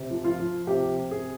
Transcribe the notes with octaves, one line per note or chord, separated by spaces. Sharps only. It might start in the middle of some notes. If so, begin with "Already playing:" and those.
Already playing: C3
F3
F4
F3
C3 G4
C3
G#4